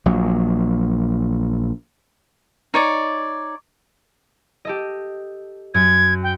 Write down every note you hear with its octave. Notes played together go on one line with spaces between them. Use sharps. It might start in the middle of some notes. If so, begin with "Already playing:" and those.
A#1 F#3
D#4 C#5 D5
G4 A4 D#5
F#2 G#6
G5